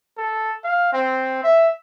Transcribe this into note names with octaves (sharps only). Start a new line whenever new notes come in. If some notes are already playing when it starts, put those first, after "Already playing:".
A4
F5
C4
E5